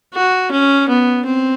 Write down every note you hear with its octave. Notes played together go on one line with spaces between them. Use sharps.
F#4
C#4
B3
C4